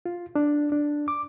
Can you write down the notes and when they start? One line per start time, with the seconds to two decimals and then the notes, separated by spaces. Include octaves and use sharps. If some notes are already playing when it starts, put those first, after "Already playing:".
0.06 F4
0.35 D4
0.72 D4
1.08 D6